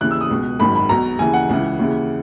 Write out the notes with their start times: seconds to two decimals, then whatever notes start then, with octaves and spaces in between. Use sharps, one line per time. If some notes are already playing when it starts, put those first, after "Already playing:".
0.01 D#2 C#3 E3 F#6
0.11 E6
0.21 D#6
0.30 C#2 B2
0.59 G#1 F#2 D#3 B5
0.75 B5
0.89 B1 B2 A#5
1.19 D#2 C#3 E3 G#5
1.33 F#5
1.49 C#2 C#3 E3
1.79 D#2 C#3 E3